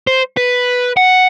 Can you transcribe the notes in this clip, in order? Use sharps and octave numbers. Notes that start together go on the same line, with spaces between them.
C5
B4
F#5